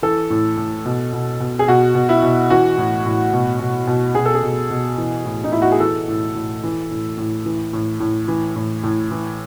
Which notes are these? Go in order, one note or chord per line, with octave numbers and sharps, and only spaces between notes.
E3 A4
A2
A2
B2
B2
B2
G#4
B2 F#4
B2
E4
B2
E3 F#4
A2
A2
B2
B2
B2
B2 G#4
A4
G#4
B2
B2
E3
A2
D#4
A2 E4
F#4
G#4
E3 A4
A2
A2
E3
A2
A2
E3
A2
A2
E3
A2
A2
E3